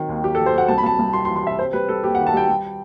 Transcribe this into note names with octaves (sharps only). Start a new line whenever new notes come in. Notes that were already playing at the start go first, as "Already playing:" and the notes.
Already playing: D#3 F#3 C4
D#2
F#3 G4
A4
F#3
C5
F#3 F#5
C2 A5
B5
C2 A5
C2
C3 C6
C6
E3
C6
C3 E5
C4 C5
G3 B4
G3 A4
D#2 G4
F#5
D#3
A5
G3 G5
G3